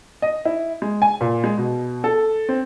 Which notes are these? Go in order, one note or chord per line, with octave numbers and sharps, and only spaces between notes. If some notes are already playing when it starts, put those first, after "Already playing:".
D#5
E4
G#3
G#5
A#2
G#3
B2
A4
C4